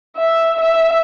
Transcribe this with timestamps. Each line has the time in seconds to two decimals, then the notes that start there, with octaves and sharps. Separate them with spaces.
0.17 E5
0.60 E5